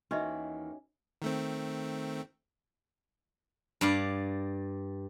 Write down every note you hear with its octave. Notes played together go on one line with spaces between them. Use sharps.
D#2 D#3 E3 C#4 F#4 D#5 E5
D#3 A3 C4
G2 D5 F5